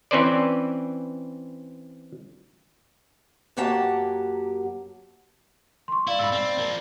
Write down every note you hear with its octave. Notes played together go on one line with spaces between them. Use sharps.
E3 C4 C#4 B4 C5 D5
F#2 F#3 A#3 G4 F#5 A5
C6 C#6
E4 D5 F5
G#2 B5 E6
C4
F3 A#3